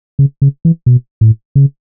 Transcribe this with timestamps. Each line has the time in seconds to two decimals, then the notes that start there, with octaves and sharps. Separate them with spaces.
0.19 C#3
0.42 C#3
0.65 E3
0.86 B2
1.21 A2
1.55 C#3